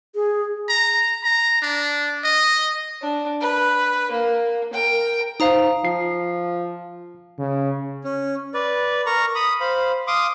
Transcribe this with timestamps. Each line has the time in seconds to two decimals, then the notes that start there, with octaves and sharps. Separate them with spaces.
0.15 G#4
0.69 A#5
1.24 A#5
1.62 D4
2.24 D#5
3.02 D4
3.41 B4
4.11 A#3
4.73 A#4 G5
5.40 D#4 C5 F5 A#5 D#6
5.85 F3 C7
7.39 C#3
8.04 C#4
8.54 B4 D5
9.06 A#4 A#5 C#6
9.35 B5 D#6
9.61 C5 F5 B5
10.07 F5 C6 D6 D#6